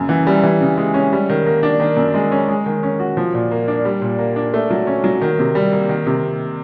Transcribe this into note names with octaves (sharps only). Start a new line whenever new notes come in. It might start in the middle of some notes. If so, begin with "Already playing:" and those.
Already playing: F#2 C#3
E3
G3
E3
C#3
G#3
C#4
G3
D#3
A#3
D4
D#3
F#2
G#3
C#4
G#3
D#3
C#4
F#4
F3
A#2
A#3
D4
G3
A#2
A#3
D4
A3
F#3
C#4
F#3
D#3
C3
G3
A#3
D#3
C3